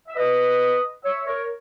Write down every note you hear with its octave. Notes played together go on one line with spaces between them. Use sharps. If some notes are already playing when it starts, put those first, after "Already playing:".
E5
B4 D#5
C#5 E5
A#4 C#5